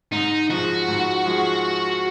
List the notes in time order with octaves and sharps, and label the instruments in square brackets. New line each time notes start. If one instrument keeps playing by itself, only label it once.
[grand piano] G#2 [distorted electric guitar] D#4
[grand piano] F3 G#3 [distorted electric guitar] F#4
[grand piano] G#2
F3 G#3